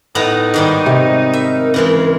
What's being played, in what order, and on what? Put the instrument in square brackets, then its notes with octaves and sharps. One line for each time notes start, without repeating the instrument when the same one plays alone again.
[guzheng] A2 B3 A#5 [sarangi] D#4
[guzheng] G#2 D#3 G3
[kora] C3
[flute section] A#4 [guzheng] E5
[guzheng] C#3 E3 G#3